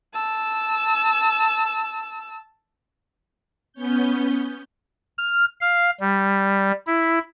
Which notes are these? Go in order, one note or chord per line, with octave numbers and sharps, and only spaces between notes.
A5 E6
B3 C#4 G6
F6
F5
G3
E4